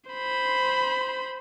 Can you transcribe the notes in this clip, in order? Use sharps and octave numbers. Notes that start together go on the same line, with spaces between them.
C5 B5